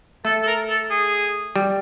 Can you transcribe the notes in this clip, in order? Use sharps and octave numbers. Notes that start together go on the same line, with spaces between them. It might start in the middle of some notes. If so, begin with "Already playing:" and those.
A3 A4
A4
A#4
A4
G#4
G3